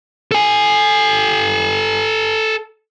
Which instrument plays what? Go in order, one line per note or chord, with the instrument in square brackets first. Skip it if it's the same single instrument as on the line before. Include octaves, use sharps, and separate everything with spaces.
[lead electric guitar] A4 G#5